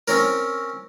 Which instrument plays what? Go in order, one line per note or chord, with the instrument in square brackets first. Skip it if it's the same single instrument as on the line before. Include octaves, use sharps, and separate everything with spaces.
[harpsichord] C4 C#4 A#4